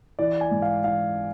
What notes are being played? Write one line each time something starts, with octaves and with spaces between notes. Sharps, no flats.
E3 D5
G#5
G#2
F5
E3 F5